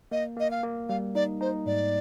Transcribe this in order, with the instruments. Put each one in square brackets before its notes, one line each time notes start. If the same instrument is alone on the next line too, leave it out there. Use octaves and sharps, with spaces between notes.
[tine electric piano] A#3 [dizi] D#5
[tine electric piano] A#3 [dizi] D#5
[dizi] F5
[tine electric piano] A#3
[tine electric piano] G3 [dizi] F5
[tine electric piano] D#4 [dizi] D5
[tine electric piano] D#4 [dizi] C5
[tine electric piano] G#2 [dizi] D5